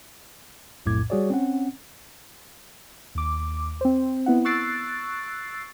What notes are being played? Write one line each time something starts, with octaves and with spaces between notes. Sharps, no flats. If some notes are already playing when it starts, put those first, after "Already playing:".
B1 F2 A2 D6 G#6
G3 F#4 G#4 C#5 D5
C4 C#4 F#5
D#2 D6
C4 C5
B3 E4 F#5
C#6 E6 F#6 A6 C7 D7